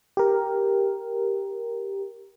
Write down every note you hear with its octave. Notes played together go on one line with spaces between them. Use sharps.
G4 A#4